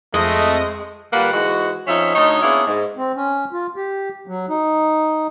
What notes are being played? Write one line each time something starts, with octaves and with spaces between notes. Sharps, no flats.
F2 G#3 A3 D#5 A#6
D3 G3 A#3 F4 B4 F#5
G#2 E3 G#3 F#4
F2 F3 C#4 D#4 E5
D2 D#4 C#5
A#3 B3 C#4 D4 E4 G#4
G#2
C4
C#4
F4
G4
F#3
D#4